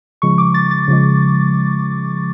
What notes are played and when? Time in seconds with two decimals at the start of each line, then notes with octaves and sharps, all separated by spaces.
0.22 C#3 F3 G#3 C#6
0.38 D6
0.54 A6
0.71 A6
0.88 C#3 F3 G#3